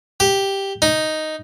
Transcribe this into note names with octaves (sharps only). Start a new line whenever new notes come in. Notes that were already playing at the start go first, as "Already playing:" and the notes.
G4
D#4